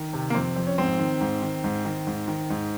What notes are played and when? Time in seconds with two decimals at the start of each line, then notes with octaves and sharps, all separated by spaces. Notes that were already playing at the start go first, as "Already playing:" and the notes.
Already playing: D#3
0.13 C3
0.30 A#3
0.35 F2 C4
0.56 F2
0.67 C#4
0.78 G#2 C4
0.99 D#3
1.21 G#2
1.42 D#3
1.64 G#2
1.85 D#3
2.07 G#2
2.28 D#3
2.50 G#2